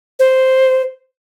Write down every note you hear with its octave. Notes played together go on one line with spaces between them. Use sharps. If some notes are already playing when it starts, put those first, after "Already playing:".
C5